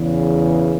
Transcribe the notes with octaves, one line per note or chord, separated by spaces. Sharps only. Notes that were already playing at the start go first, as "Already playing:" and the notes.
Already playing: E2 C#3 E3